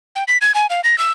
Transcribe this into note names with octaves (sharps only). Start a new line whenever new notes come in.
G5
B6
G#6
G#5
F5
A#6
E6